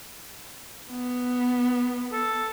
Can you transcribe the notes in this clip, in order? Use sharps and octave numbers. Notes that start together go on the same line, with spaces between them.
B3
A4